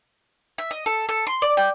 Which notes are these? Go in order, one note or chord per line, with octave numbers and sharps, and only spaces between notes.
E5
D#5
A4
A4
C6
D5
G5